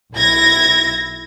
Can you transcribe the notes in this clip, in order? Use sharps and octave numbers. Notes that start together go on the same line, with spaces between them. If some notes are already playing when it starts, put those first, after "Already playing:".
B1 E4 G#6 A#6